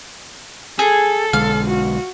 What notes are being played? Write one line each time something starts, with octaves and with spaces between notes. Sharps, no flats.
G#4 A4
B1 D3 G#3 F5
F#4